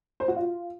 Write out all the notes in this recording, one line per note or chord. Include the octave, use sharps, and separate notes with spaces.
C5
F#4
F4